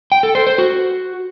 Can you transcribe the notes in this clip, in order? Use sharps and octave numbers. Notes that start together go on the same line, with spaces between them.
G5
A4
C5
C5
F#4